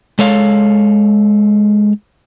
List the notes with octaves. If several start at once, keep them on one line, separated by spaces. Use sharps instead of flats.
G#3 A4 C#5 F5